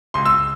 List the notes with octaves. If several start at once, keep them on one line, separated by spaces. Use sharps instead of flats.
C#2 C6
E6